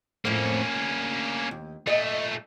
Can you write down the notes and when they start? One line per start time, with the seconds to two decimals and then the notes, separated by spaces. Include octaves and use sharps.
0.25 F2 A2 A#3 C#4
0.75 D2
1.51 D#2
1.87 A#2 A3 D#5